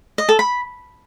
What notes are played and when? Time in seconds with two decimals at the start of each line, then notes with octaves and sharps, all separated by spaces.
0.18 D#5
0.29 A4
0.39 B5